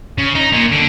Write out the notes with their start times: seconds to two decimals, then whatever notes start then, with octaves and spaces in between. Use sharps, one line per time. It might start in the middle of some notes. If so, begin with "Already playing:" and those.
0.18 C#3
0.35 D#4
0.52 A#2
0.72 D3